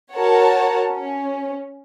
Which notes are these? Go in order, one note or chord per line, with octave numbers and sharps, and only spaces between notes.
F#4 A#4 C#5 F#5 A5
C#4